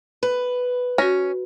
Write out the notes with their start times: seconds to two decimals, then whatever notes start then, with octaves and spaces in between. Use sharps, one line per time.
0.23 B4
0.98 C#4 F#4 A#6